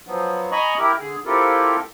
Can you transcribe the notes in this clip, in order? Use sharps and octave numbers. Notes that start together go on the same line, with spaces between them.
F3 F#3 B3
D#5 G#5 A#5 B5 C#6
E4 G4 A#4
D3 G#4
C4 E4 F4 G4 A4 A#4